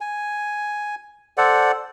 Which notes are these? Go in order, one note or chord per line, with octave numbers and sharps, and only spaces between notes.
G#5
A4 C5 D5 F#5